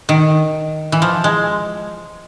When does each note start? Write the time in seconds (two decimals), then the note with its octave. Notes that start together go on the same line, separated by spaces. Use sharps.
0.09 D#3
0.92 E3
1.02 F3
1.24 G#3